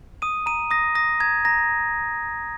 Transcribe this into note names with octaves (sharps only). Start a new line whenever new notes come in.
D#6 D#7
A#5 D#7
D#6 A#6
D#6 A#6
A#5 G#6
A#5 A#6